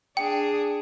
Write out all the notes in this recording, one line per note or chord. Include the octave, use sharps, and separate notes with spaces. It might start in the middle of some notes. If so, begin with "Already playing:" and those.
D4 G#4 G5